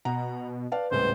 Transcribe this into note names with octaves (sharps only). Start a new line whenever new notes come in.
B2 F#5 A#5
B4 D5 F5 A5
D#1 G#1 A2 C#3 C5